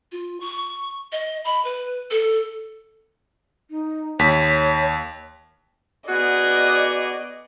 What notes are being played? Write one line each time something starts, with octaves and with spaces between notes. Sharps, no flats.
F4
C#6
D#5
B5
B4
A4
D#4
D#2 C#5 B6
B3 F#4 G#4 D5 D#5